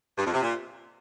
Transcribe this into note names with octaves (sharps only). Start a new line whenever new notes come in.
G2
F2
C3
A#2